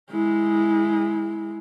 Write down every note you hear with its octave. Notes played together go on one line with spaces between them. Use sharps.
G#3 E4